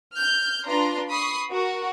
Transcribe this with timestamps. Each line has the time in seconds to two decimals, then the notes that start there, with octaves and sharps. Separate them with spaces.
0.18 F6 G6
0.69 D4 F4 B4 A#5 C6
1.10 B5 C#6 D#6 C7
1.52 F#4 A#4